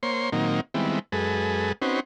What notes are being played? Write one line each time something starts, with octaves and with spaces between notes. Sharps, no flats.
A#3 C5 C#5 C6
A#2 D#3 F#3 A#3 C4 D#4
D#3 G3 G#3 B3 C4 E4
F#2 G#3 G#4 A4 B4
C4 C#4 D#4 F#4 B4 C5